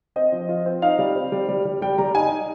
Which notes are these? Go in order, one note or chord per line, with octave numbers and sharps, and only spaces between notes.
C4 D#5
F3
F4
C4
D#4 F5
G3
C4
G3
G3
G3
G3 G5
G3 A#5
D#4 G#5
D#4